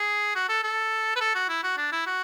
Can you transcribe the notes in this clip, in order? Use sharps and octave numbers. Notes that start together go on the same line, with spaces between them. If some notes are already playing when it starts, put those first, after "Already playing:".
Already playing: G#4
F#4
A4
A4
B4
A4
F#4
E4
F#4
D4
E4
F#4